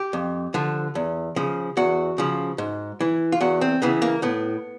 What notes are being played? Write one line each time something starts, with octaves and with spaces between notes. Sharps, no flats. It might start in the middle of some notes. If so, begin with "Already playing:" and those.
Already playing: G4
F2
D3 F3
E2
C#3 F3
E2 F#4
C#3 F3
G#2
E3
F4
E2 F#4
C4
C#3 E3 B3
A#3
A2 B3